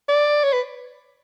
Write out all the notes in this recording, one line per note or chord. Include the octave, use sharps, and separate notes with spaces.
D5
C#5
B4